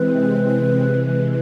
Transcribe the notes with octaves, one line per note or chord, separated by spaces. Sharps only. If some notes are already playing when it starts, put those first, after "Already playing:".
Already playing: C3 E3 G#3 C4 B4
C3 E3 G#3